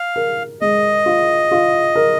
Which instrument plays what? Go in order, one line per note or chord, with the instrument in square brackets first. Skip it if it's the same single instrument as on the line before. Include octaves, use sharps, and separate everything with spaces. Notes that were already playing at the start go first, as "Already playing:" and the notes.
Already playing: [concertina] F5
[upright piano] A#4
[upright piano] G#3 [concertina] D#5
[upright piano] F4
F4
A#4